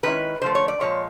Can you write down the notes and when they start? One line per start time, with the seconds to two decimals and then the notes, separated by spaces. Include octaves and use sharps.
0.03 D#3 G#3 C#4 E4 B4
0.42 D3 F3 A3 C5
0.55 C#5
0.68 D5
0.80 A#2 F3 G#3 C#5